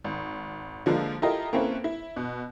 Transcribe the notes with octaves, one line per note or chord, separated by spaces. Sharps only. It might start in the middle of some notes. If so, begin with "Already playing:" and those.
G#1
D3 F3 G#3 A#3
E4 F4 G4 A4 A#4 D#5
A#3 C4 C#4 E4 A4 B4
E4
B2